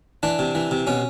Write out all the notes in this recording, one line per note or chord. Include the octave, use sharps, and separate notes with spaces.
E3 D4
C3
E3
C3
B2 C#4